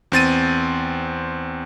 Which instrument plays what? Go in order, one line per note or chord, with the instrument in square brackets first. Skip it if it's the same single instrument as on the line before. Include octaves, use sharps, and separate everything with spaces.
[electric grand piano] E2 C4 A6 D#7